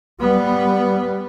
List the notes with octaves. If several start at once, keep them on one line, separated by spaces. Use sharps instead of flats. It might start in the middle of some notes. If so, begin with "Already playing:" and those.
G3 B3